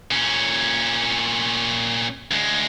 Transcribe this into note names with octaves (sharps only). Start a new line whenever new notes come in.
A#2 C#4
D2 G#3